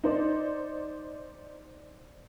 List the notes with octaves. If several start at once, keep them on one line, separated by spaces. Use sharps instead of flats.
D#4 C5 D5